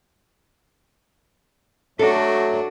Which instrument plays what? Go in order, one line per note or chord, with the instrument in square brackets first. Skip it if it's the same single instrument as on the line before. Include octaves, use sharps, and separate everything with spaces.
[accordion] F#3 A3 [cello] D4 F#4 [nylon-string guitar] A4